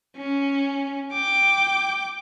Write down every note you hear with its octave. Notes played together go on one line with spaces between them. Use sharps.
C#4
G5 D6